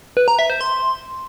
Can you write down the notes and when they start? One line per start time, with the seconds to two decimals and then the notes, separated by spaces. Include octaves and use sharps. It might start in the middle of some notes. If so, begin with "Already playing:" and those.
0.17 B4
0.28 A#5
0.39 E5
0.50 C5
0.61 C6